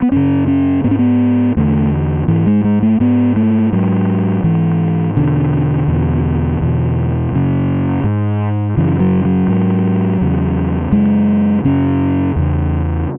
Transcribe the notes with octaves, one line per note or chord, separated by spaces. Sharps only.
B3
F#2 C#3 C#4
C#4
G#2 B3
C#4
B3
E2 D3 A3
G#2 E3
G#3
G#3
A3
G#2 B3
A3
G#2 F#3
G#2 E3
E2 B2 D3
E2 B2
E2 B2
F#2 C#3
G#2
F#2 C#3 E3
F#3
F#3
G#2
E2 C#3
F#2 C#3 G#3
F#2 C#3 C#4
E2 C#3